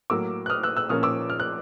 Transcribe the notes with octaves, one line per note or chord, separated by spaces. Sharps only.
A2 F#3 A#3 D6 E6
F#6
D#6 F6
E6 F#6
E6 F#6
A#2 F3 A#3 C#4 D#6 F6
D6 E6
F6
F#6